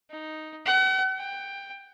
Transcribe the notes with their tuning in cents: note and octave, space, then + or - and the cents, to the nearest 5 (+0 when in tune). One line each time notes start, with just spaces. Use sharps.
D#4 +0
F#5 +40
G5 +15